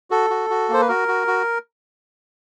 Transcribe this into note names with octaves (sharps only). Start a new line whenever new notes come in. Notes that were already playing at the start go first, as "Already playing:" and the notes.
F#4 A4
F#4
F#4
A#3 C5
B4
F#4 A#4
F#4
F#4